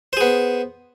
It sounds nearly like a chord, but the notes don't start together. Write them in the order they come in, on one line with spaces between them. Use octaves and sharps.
C5 G#4 B3